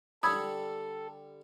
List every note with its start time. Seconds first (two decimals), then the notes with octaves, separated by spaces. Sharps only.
0.23 D3 G3 A4 B5 D#6 E6 G#6